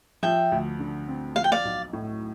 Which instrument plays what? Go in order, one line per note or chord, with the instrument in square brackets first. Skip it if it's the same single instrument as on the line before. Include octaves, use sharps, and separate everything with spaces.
[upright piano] F3 [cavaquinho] E5 G5
[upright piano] D2
D3
C4
[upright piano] F3 [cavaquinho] F5
[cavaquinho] G5
D5 F5
[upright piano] B1
A2